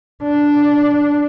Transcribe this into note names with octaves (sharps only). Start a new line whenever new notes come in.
D4